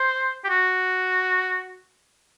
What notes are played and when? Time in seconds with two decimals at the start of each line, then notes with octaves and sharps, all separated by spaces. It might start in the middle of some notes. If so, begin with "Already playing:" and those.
Already playing: C5
0.44 G4
0.49 F#4